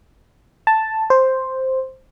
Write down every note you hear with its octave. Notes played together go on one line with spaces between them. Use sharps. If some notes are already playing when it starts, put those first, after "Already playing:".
A5
C5